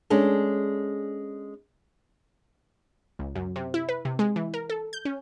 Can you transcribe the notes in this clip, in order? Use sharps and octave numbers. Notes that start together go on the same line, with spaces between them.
G#3 C#4 D4 A4
C#2
F#2
C3
E4
B4
C3
G#3
E3
A#4
A4
G6
C#4